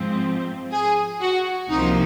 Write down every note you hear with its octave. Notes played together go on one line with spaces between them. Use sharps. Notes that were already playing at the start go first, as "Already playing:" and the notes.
Already playing: G#2 F3 C4
G#4
F#4
C2 C3 F3 A#3 D#4